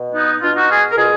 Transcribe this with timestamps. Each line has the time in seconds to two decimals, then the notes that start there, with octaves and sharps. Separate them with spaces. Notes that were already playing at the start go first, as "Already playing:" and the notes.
Already playing: B2
0.13 B3 D#4
0.40 B2 D4 F4
0.55 D#4 F#4
0.69 F4 G#4
0.91 A#4
0.96 B2 F4 G#4